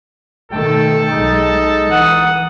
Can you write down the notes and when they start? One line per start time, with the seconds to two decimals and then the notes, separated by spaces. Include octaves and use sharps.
0.52 B2 D#3 A3 A4 G5
1.10 B1 G#3 D#4
1.90 E3 F#5 D#6